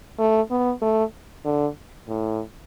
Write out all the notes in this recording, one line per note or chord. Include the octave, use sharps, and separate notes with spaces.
A3
B3
A3
D3
A2